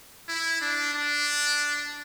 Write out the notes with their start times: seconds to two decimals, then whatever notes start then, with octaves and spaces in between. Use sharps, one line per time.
0.28 E4
0.61 D4
0.94 D4